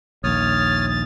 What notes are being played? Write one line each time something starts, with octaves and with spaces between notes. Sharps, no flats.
A#1 D#2 C#5 D#6 F6 A6
A6